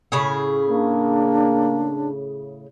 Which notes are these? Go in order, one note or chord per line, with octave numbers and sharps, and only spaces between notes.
A2 C#3 G#4
A#3 D4